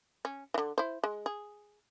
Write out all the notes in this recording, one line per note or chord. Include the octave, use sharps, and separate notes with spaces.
C#4
D3 E3
E4 C5
G#3
G#4